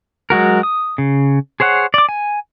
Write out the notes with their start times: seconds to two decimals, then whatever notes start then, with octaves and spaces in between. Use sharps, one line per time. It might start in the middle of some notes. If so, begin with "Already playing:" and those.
0.30 F#3 G#3 F#4 A#4
0.63 D#6
0.98 C#3
1.60 G#4 C5 C#5 F#5
1.94 D5 D6
2.09 G#5